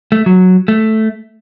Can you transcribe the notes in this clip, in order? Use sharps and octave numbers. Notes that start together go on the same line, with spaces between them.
A3
F#3
A3